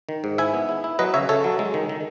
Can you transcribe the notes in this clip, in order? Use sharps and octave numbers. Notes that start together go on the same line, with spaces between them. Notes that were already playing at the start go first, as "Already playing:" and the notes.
D#3
G#2
E4 E5 G#5
B3
E4
E4
F#3 B4 D#5
C#3 C#5 E5
C#3 A4 C#5
F#3
G#3
D#3
D#3